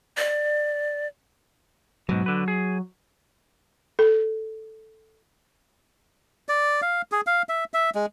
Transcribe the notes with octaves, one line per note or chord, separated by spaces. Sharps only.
D5
G#2 B2 F#3
D3 B4
G#4
A4
D5
F5
G#4
F5
E5
E5
G#3